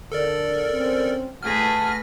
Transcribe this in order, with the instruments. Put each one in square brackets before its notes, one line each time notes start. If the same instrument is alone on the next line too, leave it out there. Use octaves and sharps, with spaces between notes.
[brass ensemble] D3 [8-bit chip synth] A4 A#4 D5
[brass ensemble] C4 C#4
[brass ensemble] A2 F#5 A5 [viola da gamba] A3 G#4 B4 [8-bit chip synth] F6 A#6